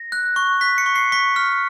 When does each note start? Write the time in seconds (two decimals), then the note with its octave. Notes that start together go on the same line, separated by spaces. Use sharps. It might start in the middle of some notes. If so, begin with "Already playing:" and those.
Already playing: A#6
0.12 F#6
0.36 C#6
0.61 F#6 B6
0.78 C#7
0.86 C#6
0.96 C7
1.12 C#6 B6
1.36 F6